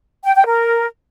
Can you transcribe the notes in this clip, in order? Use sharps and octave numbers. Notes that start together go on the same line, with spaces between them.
G5
G5
A#4